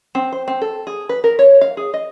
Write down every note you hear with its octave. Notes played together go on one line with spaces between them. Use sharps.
C4
C5
C4
A4
G#4
B4
A#4
C#5
F5
G#4
D#5